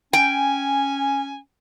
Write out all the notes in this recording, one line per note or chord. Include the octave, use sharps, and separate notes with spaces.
C#4 G5 G#5